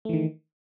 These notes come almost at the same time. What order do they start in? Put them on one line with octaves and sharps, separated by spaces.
A3 E3 D#3